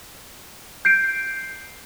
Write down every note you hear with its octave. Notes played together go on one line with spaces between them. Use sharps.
G6 C7 D7